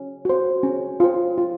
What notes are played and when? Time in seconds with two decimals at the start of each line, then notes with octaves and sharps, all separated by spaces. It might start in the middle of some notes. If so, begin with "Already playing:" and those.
Already playing: C#4
0.25 F#4 C5
0.63 C#4
1.00 F4 C5
1.38 F4